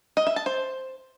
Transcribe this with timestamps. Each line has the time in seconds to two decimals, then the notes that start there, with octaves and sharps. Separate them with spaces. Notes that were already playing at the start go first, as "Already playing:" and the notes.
0.17 D#5
0.27 E5
0.36 A5
0.46 C5